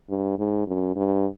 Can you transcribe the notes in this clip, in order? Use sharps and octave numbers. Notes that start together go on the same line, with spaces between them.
G2
G#2
F#2
G2